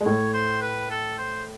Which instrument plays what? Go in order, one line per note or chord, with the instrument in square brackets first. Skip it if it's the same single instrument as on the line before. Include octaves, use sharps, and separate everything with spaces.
[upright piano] G#3
[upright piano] A2 A3 [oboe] C#5
[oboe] C5
B4
A4
C5